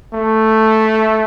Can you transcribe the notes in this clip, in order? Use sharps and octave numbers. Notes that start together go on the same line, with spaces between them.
A3